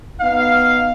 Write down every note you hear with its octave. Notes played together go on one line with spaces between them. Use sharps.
B3 D#4 F5